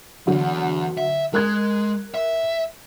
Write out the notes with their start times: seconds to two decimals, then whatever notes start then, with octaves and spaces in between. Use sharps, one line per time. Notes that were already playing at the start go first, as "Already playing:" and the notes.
0.27 E2 G2 D3 F#3
0.98 E5
1.34 G#3 A#4 F#6 G#6
2.14 E5